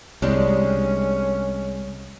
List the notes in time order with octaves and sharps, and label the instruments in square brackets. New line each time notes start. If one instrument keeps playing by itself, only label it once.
[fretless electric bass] C2 [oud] G#3 D4 G4 [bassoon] C#4